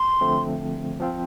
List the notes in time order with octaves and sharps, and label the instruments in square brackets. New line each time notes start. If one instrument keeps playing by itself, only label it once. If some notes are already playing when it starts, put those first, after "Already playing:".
Already playing: [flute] C6
[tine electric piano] D3 F3 A3 C4
F3 C4 F4